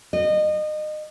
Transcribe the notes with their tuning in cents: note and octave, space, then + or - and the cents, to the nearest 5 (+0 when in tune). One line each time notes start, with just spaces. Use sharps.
D#5 -25